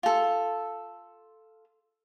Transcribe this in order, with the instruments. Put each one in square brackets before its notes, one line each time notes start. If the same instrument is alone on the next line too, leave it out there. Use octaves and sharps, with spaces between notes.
[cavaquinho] F4 A4